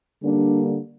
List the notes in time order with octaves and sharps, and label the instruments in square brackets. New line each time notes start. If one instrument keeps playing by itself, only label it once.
[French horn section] D3 G3 A#3 D4